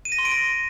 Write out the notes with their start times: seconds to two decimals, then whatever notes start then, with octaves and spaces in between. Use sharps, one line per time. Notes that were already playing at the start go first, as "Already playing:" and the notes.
0.05 D#7
0.12 A#6
0.19 C6
0.25 D7
0.32 A#6